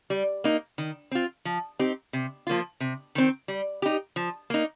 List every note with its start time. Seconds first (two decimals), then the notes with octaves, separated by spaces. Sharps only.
0.10 G3
0.44 A#3 D#4
0.78 D#3
1.11 C4 F4
1.45 F3
1.79 C4 D#4 G4
2.13 C3
2.47 F3 A#3 F4
2.80 C3
3.15 D#3 C4
3.48 G3
3.82 D#4 G4
4.16 F3
4.50 A#3 D#4